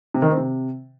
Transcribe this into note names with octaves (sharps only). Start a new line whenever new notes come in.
C3
D#3
C4
C3